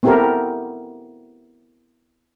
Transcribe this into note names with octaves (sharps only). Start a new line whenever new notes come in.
B3 C4 E4 G4 A4 A#4